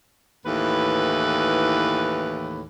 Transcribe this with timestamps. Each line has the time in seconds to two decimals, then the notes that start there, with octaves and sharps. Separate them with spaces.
0.46 D#2 A2 E3 B4